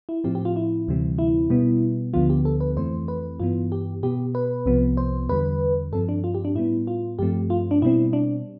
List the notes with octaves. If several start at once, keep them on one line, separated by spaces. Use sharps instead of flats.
E4
A2 F3 C4 G4
G4
F4
E4
D2 C3 E3 G3 C4
E4
B2 G3 B3
D2 D3 F3 B3 F4
G4
A4
B4
F2 E3 A3 C4 C5
B4
G2 E3 B3 F4
G4
B2 B3 G4
B4
C2 C3 F3 B3
C5
E2 D3 G3 B4
G2 F3 C4 A4
D4
F4
G4
D4
A2 G3 B3 E4
F4
G2 F3 A3 C4 G4
F4
D4
B2 G3 C4 E4
D4